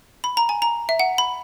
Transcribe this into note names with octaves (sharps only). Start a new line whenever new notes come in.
B5
A#5
G#5
A#5
E5
F#5
B5